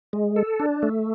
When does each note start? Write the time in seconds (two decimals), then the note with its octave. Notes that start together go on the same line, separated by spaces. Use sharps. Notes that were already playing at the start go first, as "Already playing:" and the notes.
0.13 G#3
0.36 A4
0.60 D4
0.83 A3